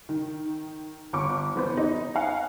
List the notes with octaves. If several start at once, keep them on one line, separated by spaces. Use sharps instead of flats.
D#3
G1 C#6 D6
E3 B3 C5
D#4
F5 F#5 G#5